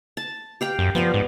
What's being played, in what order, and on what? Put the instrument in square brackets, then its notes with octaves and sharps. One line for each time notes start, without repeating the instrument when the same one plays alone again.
[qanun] A5
G4 F5 G5
[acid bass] F#2
[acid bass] F3 [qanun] B3 D5 F5
[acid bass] G#2